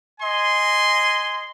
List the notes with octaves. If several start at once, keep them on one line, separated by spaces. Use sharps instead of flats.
D#5 G#5 C6